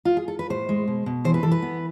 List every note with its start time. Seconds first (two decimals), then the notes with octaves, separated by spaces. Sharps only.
0.05 F4
0.17 G#4
0.28 A4
0.39 B4
0.50 A2 C5
0.69 G#3
0.88 B2
1.06 B2
1.24 E3 C5
1.34 B4
1.43 E3 A4
1.51 B4
1.62 B3